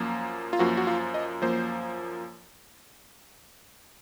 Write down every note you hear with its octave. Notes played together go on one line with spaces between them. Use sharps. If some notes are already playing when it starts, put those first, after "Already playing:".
Already playing: F#2 F3 A#3
F4
F#2 F3 A#3 F#4
F#4
F4
D#5
F#2 F3 A#3 C5